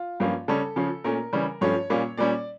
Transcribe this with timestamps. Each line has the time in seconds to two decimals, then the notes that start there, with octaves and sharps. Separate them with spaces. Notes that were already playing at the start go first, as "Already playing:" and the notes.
Already playing: F4
0.20 G2 F3 A#3 C#4
0.48 C#3 G3 C#4 A4
0.76 C#3 F3 C#4
1.04 A#2 A3 C#4 A#4
1.33 C#3 E3 G3 C#4
1.61 G2 F3 A3 C#4 C#5
1.90 A#2 G3 A#3 C#4
2.17 A#2 G3 C#4 D5